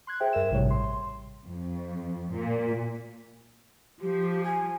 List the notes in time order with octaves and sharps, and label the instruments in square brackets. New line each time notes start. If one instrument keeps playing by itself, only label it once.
[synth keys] C6 F#6 G#6
G#4 C5 E5 G5
G2 A#4 E5 E7
A1 A2 C3 G3 C#5
C6
C6
[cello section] F2
A#2
[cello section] F3 [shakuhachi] G4
[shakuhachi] G#5